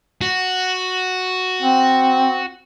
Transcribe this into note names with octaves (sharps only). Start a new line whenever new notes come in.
F#4
C4